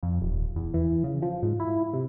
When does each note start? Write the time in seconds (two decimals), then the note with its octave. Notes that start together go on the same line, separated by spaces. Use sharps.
0.03 F2
0.22 D#1
0.56 E2
0.74 E3
1.04 C#3
1.22 F3
1.43 G#2
1.60 E4
1.93 C3